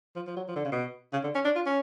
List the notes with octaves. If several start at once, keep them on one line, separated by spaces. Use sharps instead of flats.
F3
F3
F#3
F3
D3
C#3
B2
C#3
D3
C#4
D4
F4
C#4